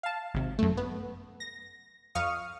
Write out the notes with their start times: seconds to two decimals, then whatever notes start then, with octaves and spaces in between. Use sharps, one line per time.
0.03 F5 A5
0.34 G#1 C3
0.59 F#2 A3
0.77 B3
1.40 A#6
2.15 F2 F5 C#6 D#6 F6